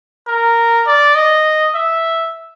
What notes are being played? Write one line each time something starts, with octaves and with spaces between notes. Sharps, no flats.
A#4
D5
D#5
E5